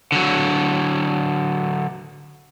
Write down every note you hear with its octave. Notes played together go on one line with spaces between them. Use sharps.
D3 F#3